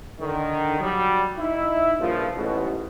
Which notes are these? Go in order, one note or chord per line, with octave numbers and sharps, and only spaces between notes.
D3 D#3
F#3 G3
D#4 E4 E5
G2 A#2 C#3 F3
A1 G#2 B2